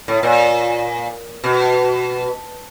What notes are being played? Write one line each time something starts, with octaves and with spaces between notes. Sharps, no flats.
A2
A#2
B2